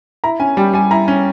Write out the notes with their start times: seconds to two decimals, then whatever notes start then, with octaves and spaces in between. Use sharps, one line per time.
0.24 E4 A#5
0.40 C#4 G#5
0.57 G3 G5
0.73 G3 G#5
0.91 E4 A#5
1.08 C#4